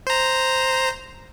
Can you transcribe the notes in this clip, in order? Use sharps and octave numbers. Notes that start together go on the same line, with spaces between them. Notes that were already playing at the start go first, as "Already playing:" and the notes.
C5 A#5